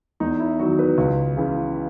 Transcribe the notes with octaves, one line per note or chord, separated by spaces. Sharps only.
E2 D#4
E4
D#3 F#3 F#4
B4
C#2
C#3 E3